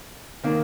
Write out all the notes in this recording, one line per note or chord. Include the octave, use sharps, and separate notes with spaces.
D#3 A#3